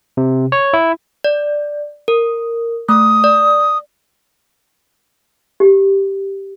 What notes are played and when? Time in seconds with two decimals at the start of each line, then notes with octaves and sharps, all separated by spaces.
0.17 C3
0.52 C#5
0.73 E4
1.24 D5
2.08 A#4
2.89 A3 D#6
3.24 D5
5.60 G4